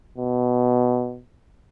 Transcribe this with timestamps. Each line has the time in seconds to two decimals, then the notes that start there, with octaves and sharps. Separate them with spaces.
0.18 B2